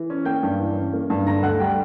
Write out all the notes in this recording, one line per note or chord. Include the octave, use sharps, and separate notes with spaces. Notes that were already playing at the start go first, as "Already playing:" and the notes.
Already playing: E3
C#4
A#3 G5 G6
G2
E3
C#4
A#3
G2
D3 A#5 A#6
D2 F#5 F#6
G3 G4 G5